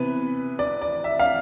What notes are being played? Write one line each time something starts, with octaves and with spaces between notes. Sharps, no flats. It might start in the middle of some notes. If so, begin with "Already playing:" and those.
Already playing: C3 E3 B3 B4
D5
D5
E5
F5